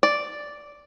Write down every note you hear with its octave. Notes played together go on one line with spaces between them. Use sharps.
D5